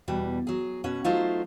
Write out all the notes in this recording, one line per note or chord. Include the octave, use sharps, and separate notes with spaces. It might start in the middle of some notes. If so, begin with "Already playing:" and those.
E2 B2 G3
F#3 G#4
B2 C#4 F#5
F#3 A3 D#4 F4 C5